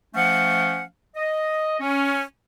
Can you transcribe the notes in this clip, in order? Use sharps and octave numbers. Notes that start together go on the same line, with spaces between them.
F3 A3 C#4 F5 F#5
D#5
C#4